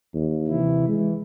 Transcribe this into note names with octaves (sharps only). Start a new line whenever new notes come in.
D#2
C3 E3 E4
E3 G#3